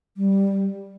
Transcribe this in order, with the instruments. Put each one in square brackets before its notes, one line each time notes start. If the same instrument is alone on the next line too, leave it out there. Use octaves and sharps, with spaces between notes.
[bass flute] G3